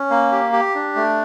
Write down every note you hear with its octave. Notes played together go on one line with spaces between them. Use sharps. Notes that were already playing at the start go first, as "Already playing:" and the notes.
Already playing: C#4
A#3
G4
G4
D4
A3